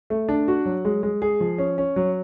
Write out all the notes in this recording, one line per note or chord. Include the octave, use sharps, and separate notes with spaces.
A3
D4
F#4
F#3
G#3
G#3
G#4
F3
C#4
C#4
F#3